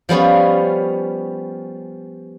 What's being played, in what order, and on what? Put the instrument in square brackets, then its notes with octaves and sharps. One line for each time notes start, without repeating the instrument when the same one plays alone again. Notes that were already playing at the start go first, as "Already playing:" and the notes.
[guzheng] F3 G3 B3 C#4